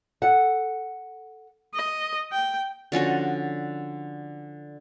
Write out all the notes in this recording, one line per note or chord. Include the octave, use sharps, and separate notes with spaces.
A4 F#5
D#5
G5
D3 F3 C#4 F#4